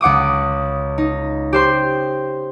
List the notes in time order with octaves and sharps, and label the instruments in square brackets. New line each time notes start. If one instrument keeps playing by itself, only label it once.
[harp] C#2 F#5 D6 D#6
D#4
G4 C5 C6